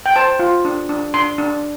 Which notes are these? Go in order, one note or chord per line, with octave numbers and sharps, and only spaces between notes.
G5
C5 A5
F4
D4
D4
D4 C6
D4